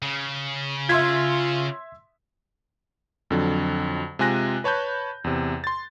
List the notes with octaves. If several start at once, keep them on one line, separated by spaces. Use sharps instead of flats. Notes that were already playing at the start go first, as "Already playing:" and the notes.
C#3
F4 E5 C6 G#6 B6
F2 D3 F#3
C3 G#3 F4 G#5 F#6 A#6
B4 C#5 A5 B5 G6
E2 C3
C6 A6